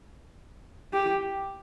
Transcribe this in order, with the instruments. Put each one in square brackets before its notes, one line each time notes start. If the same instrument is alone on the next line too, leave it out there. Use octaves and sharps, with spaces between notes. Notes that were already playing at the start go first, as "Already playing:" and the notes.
[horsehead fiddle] G4